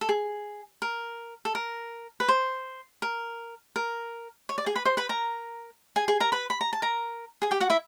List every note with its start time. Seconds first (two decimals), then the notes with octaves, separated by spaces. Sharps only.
0.01 A4
0.09 G#4
0.82 A#4
1.45 A4
1.55 A#4
2.20 B4
2.28 C5
3.02 A#4
3.76 A#4
4.49 C#5
4.58 D5
4.66 G#4 G#5
4.75 B4 B5
4.85 C5 C6
4.97 B4 B5
5.09 A#4 A#5
5.96 G#4 G#5
6.08 G#4 G#5
6.20 A#4 A#5
6.32 B4 B5
6.50 B5
6.61 A#5
6.73 A5
6.82 A#4 A#5
7.42 G#4 G#5
7.51 G4 G5
7.60 F#4 F#5
7.70 E4 E5